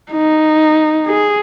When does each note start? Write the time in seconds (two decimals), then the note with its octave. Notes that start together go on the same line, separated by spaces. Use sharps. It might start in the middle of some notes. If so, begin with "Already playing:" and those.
0.11 D#4
1.07 G#4